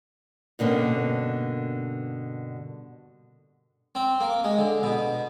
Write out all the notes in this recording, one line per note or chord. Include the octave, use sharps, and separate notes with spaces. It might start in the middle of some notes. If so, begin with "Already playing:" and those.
G2 B2 D3 A#3 C#4
C4
A#3
G#3
D3
B2